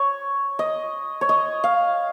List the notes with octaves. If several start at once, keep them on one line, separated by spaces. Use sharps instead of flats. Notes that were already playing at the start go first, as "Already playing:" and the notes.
Already playing: C#5
D#5
C#5
D#5
F5